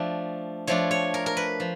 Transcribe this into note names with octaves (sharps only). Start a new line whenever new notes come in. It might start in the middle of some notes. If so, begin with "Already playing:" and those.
Already playing: F3 A3 D4
F3 A3 D4 C#5
C#5
A#4
A#4
B4
F3